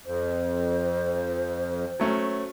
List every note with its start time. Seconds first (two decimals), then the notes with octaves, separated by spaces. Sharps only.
0.06 F2 C5
2.00 F#3 A3 C#4